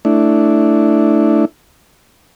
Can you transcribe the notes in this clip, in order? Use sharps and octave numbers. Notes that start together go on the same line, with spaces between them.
A3 D4 E4